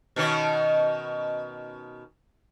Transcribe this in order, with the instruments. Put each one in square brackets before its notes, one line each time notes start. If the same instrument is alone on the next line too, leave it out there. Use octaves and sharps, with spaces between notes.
[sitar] B2 D#3 C#4